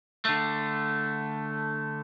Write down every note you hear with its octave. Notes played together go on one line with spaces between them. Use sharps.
D3 A3